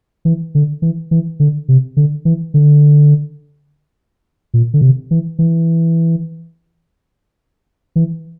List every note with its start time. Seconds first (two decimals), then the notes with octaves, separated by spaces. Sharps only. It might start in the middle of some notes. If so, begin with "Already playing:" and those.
0.25 E3
0.55 D3
0.82 E3
1.11 E3
1.40 D3
1.69 C3
1.97 D3
2.25 E3
2.54 D3
4.54 A#2
4.74 D3
4.81 C3
5.11 E3
5.39 E3
7.96 E3